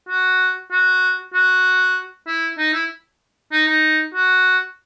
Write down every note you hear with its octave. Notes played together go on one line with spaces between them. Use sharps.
F#4
F#4
F#4
E4
D#4
E4
D#4
D#4
F#4